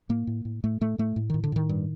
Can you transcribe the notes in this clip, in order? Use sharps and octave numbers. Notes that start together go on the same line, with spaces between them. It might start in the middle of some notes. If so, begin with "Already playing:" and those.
A2 A#3
A2
A2
A2 A3
A2 A3
A2 A3
A2
A2 D#3
D3
A2 D#3
G2